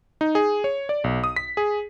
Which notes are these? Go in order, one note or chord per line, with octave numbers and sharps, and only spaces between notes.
D#4
G#4
C#5
D5
B1
D#6
B6
G#4